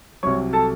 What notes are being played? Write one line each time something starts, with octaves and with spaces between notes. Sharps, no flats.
C2 C3 F#3 C#5 C#6
A4 A5